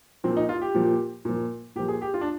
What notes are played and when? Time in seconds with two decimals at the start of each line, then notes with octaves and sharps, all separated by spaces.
0.24 A#2 F3 C4
0.37 D#4
0.49 F4
0.62 G4
0.75 A#2 F3
1.25 A#2 F3
1.76 A#2 G4
1.79 F3
1.88 G#4
2.02 G4
2.14 F4
2.21 D4